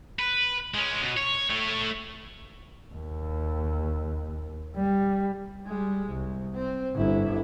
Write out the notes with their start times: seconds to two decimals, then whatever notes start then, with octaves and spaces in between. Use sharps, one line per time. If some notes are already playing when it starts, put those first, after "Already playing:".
0.19 B4
0.74 G#3 C#4
1.02 B2
1.17 C#5
1.50 A3 C#5
2.95 D#2
4.76 G3
5.67 G3 G#3
6.10 C2
6.55 C4
6.94 G1 E4